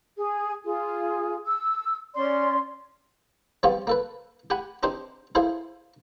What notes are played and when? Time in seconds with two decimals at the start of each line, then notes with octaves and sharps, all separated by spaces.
0.16 G#4
0.65 F4 G#4
1.46 E6
2.15 C#4 D5 C6
3.63 F3 G3 B3 C4 F4 G4
3.87 A#3 A4 B4
4.50 G4 F#5 G#5 B5
4.83 C4 D4 D#4 G4 C5
5.35 E4 G#4 A4 C5 F5